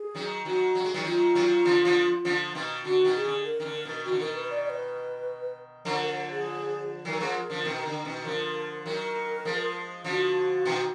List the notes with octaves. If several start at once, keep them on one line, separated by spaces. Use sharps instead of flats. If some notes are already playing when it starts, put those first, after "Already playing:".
Already playing: G#4
D#3 F#3
D#3 F#3 F#4
F#3
G#3
D#3 F#3
D#3 F#3 F4
D#3 F#3
D3 F3
D3 F3
D3 F3
B2 D#3
D3 F#4
B2 D#3
G#4
D3
A#4
D#3
D3
B2 D#3
D#3 F#4
D3
B2 D#3 A#4
B4
D5
D5
B4
D3 F3 A#4
A#4
G#4
D#3 F#3 A#4
F3 G#3
D3 F3
B2 D#3
D3
B2 D#3
D3 F3 A#4
D#3 F#3 A#4
F3 G#3
D3 F3 F#4
B2 D#3